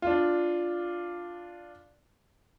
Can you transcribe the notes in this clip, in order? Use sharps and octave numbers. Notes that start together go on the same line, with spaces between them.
D4 F4